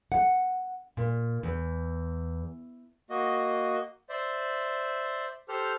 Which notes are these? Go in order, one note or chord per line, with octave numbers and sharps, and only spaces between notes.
F#5
A#2
E2
A#3 F#4 D#5
C5 D5 E5
G4 A4 C5 F6